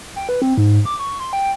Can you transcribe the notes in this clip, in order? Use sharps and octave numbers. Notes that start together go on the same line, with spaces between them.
G5
B4
C4
G#2
D6
C#6
C6
G5